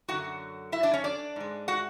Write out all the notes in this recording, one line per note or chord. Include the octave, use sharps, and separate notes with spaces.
F#2 D3 F#3 F#4 F#5
E4 E5
D4 D5
C#4 C#5
D4 D5
G#2 G#3
F#4 F#5